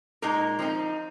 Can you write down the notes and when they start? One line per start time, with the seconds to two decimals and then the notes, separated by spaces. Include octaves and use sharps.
0.22 A#2 G#3 D#4 A#4
0.59 F3 C4 D#4